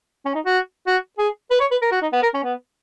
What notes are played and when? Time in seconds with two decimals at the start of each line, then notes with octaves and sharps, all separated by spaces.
0.25 C#4
0.35 D#4
0.46 F#4
0.87 F#4
1.18 G#4
1.51 B4
1.60 C#5
1.71 B4
1.82 A#4
1.92 F#4
2.02 D#4
2.13 B3
2.23 A#4
2.34 C#4
2.44 B3